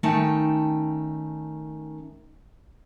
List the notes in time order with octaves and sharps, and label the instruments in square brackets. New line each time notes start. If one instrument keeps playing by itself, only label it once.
[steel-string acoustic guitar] D#3 A3 C#4 D#4 G5 A5